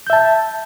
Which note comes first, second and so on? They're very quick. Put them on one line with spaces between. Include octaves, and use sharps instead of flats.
G6 E5 A5